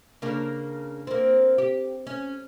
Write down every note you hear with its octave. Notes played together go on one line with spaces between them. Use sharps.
C#3 A#3 D4
A#3 C4
G4
C#4